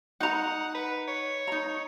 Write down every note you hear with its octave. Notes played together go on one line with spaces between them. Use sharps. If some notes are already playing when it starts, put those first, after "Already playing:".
D#4 F#5 A#5
B4
C#5
D#4 A#5